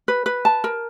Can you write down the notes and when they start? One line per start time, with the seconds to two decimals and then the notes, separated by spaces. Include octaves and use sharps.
0.08 B4
0.26 B4
0.45 A5
0.64 A#4